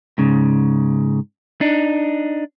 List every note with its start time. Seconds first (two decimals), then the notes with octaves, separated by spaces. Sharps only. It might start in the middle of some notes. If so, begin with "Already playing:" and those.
0.18 G#2 C#3
1.61 D4 D#4